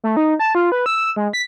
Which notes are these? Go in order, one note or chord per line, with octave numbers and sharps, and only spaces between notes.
A3
D#4
A5
F4
B4
E6
G#3
B6